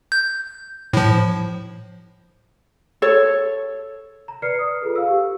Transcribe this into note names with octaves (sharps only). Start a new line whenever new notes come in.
G6
A2 F3
A4 C#5
A#5
B4 D5 F6 C7 C#7
D#6
F4 G#4 A4 B4
F5 E6
G4